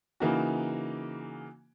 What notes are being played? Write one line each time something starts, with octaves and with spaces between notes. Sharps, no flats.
C#3 E3 A#3 D#4 F#4